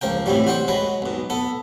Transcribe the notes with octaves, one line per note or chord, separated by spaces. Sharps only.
C#2 F3 A#4 G5
A2 C3 E3 F#3 G3
F#4 C5 F#5 G5
F#3 G#3 B4
B1 B2
B3 A4